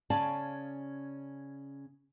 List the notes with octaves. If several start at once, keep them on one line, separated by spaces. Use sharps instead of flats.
C#3 C#4 D5 F5 G#5 A5